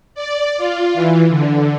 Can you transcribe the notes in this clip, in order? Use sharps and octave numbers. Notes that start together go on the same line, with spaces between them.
D5
F4
E3
D3